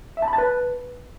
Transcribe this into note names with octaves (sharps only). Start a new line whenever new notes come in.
E5
A5
B5
A5
B4